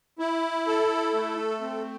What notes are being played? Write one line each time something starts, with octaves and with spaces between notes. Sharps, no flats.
E4
A4
A3
C4